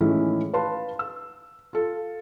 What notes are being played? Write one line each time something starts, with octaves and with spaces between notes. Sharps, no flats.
A2 D#3 E3 G#3 C#4 E4
B4 F5 A5 C6
E6
F4 A4